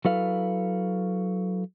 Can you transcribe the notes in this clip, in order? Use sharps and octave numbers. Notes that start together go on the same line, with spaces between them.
F#3 E4 A4 B4 F5